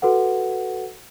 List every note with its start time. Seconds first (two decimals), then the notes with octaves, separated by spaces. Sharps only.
0.02 F#4 A4 B4 F#5